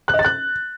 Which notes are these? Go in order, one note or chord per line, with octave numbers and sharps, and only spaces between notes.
F#6
D#5
A6
F#6